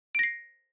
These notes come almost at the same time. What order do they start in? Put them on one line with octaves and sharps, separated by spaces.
D7 A#6 C7